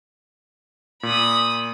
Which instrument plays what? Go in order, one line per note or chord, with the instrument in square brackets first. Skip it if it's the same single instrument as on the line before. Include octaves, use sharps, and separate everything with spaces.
[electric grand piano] A#2 [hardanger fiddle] B5 D#6